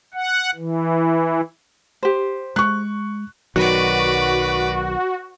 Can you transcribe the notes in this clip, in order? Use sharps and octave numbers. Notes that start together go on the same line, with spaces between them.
F#5
E3
G4 C5
G#3 C#6 F#6
B1 D#3 F#3 F#4 B4 D5